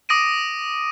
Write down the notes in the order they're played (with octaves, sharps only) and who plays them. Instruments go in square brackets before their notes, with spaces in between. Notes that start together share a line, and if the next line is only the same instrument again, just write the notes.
[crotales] D6 D#6 A#6 D7 D#7